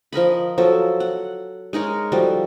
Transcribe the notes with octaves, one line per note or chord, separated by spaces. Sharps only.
F3 A#4 D#5 B5
F3 F#3 A4
F#5
G#3 D#4 A#4 C#5
F3 G3 F#4 A4